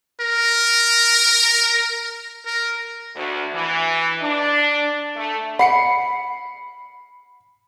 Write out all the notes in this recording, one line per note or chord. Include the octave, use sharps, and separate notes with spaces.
A#4
A#4
D2
E3
D4
A3
F#5 B5 C7 C#7